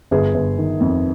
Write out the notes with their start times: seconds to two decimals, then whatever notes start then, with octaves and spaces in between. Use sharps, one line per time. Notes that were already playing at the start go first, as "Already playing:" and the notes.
0.11 G1 G#4
0.34 G1
0.58 D#3
0.80 F2